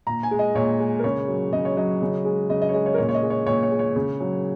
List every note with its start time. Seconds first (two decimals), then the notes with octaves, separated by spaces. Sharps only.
0.07 A#2 A#5
0.23 G#5
0.31 G#3
0.39 D#5
0.55 A#2 C#5
0.79 G#3
0.99 A#4
1.04 C#3 C#5
1.28 F#3
1.53 C#3 D#5
1.65 C#5
1.77 F#3 D#5
2.02 C#3
2.25 G#3
2.49 C#3 D#5
2.62 D#5
2.69 C#5
2.74 G#3 D#5
2.86 C#5
2.94 A#4
2.98 A#2 C#5
3.09 C#5
3.14 D#5
3.22 G#3
3.30 C#5
3.46 A#2 C#5
3.63 C#5
3.71 G#3
3.79 C#5
3.96 C#3
4.20 F#3